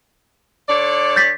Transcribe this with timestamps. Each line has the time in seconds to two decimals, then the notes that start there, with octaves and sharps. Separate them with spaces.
0.68 D3 C#5 D5
1.16 G6 A6 B6